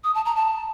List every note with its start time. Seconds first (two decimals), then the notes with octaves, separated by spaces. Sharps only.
0.04 D#6
0.15 A5
0.25 A#5
0.36 A5